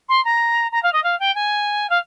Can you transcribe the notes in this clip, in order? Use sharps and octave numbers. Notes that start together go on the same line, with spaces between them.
C6
A#5
A#5
F5
D#5
F5
G5
G#5
F5